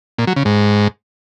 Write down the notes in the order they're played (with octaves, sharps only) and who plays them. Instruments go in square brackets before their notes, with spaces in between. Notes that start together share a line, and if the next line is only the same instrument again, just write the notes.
[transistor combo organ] A#2
F#3
C#3
G#2